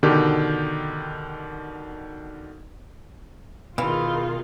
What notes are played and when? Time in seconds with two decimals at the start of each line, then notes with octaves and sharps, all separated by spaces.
0.03 B2 D3 D#3 G4
3.78 B2 D#3 E3 F4 G#4 F5